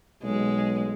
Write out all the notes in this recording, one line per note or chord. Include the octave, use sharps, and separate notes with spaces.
B1 G#3